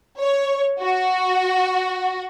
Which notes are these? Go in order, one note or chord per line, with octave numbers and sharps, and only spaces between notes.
C#5
F#4